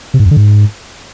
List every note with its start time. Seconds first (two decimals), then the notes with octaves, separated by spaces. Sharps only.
0.14 C3
0.20 G#2
0.25 F2
0.31 D3
0.37 G#2